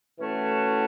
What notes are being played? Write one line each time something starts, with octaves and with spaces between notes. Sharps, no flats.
A2 E3 A3 C#4 F#4